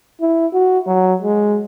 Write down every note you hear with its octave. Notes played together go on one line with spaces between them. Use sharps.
E4
F#4
F#3
G#3